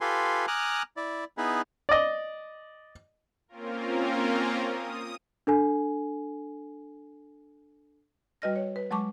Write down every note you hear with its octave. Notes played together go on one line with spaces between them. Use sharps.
F4 G4 A4 B4 G#5 C6
G#5 A#5 D6 D#6 F6 F#6
E4 D5
B3 D#4 E4 G#4 B4
D5 D#5
A#3 C4 C#4 F4 A#4
D#6
D4 A4 G#5
G3 F#4 B4 D#5 F6 A#6
C#5
B4
F#3 G#3 A5 C#6 D6